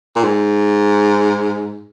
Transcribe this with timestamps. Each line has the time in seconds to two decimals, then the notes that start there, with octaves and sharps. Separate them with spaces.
0.16 A#2
0.24 G#2